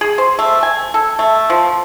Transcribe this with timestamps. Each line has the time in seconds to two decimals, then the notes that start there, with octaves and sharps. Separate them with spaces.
0.01 G#4
0.18 C5
0.39 A3
0.63 G#5
0.94 A4
1.19 A3
1.50 F3